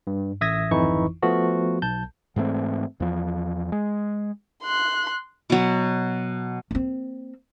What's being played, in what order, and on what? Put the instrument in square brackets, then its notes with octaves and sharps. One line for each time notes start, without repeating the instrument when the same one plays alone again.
[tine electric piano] G2
A1 E5 D#6 G#6 A#6
G#1 F2 E3 D#4 E4 C#6
F3 A3 B3 F#4
B1 A5 G6
[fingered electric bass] G#2 E3 A3 C4
E2 F3
G#3
[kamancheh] C6 F#6
[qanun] B2 F#3
[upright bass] A#3 C4